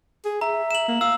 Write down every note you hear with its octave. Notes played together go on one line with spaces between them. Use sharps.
G#4
E5 A#5
E7 F#7
A#3
F5 E6